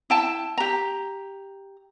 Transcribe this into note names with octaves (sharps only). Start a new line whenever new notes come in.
E4 G5 A5
G4 A#5